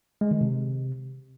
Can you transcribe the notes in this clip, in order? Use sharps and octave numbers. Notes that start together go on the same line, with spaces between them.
G#3
D#3
C3